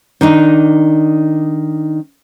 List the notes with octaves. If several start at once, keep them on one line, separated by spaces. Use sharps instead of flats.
D#3 D4 D#4